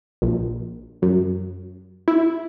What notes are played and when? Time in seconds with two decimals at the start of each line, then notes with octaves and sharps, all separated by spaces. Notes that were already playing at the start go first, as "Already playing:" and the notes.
0.22 A#1
1.02 F#2
2.08 E4